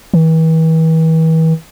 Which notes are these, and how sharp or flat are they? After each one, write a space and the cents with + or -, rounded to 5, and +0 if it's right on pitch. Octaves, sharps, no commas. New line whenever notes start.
E3 -40